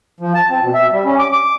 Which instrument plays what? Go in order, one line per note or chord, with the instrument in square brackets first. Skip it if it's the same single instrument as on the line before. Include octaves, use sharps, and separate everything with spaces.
[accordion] F3
A5
C4
B2
E5
G3
C#4
D6
D6